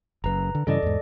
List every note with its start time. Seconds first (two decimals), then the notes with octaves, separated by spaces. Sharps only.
0.24 F#1 F#2 B4 A#5
0.55 D3
0.67 G2 C#3 E3 A4 D5 D#5
0.83 E2 G#2